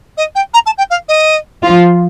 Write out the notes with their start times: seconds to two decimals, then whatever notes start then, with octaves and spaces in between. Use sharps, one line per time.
0.17 D#5
0.35 G5
0.54 A#5
0.66 A5
0.78 G5
0.90 F5
1.08 D#5
1.63 F3 F4